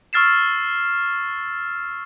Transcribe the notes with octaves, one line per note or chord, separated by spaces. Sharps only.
C#6 E6 F6 A6 C7 E7